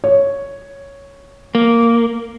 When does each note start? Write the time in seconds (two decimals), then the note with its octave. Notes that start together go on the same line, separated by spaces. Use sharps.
0.04 C#5
1.55 A#3